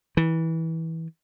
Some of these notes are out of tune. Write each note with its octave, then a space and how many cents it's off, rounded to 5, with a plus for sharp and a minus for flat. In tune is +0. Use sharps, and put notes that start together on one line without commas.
E3 -20